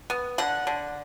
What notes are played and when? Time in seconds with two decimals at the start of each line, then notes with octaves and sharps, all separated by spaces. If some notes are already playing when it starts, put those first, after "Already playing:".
0.10 B3
0.38 D3 F#5
0.67 D3